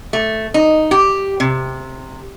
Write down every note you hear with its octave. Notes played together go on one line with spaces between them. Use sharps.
A3
D#4
G4
C3